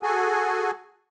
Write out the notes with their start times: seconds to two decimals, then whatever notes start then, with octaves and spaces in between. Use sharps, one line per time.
0.03 F#4 G#4 A4 G#5